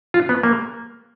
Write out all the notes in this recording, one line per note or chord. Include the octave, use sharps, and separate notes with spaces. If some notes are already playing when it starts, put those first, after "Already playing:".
F4
B3
A#3